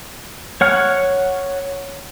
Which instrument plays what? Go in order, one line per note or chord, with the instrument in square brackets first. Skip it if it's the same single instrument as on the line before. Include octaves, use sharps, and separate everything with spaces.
[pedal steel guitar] C#5 F#5 F6